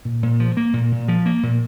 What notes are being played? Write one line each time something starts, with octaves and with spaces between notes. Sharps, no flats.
A#2
A#2
F3
A#3
A#2
A#2
F3
A#3
A#2